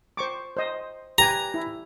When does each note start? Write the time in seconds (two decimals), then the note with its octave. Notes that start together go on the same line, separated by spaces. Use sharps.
0.17 C5 C#6 D6
0.57 C5 D#5
1.18 G4 B4 G#5 A#5
1.54 E4